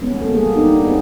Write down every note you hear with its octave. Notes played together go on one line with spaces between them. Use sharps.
G#3 B3 C#4
A#3 B3 A4
G3 A#3 G#4
B3 D4 D#4 G4
C4 C#4 G4 G#4